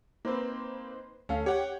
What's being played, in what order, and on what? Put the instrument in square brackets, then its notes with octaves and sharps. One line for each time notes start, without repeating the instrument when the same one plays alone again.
[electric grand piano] A#3 C4 [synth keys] D#4 B4 C5
[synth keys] D2 A4 F5 [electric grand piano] C#4
[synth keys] G4 [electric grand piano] C#5 F#5 G5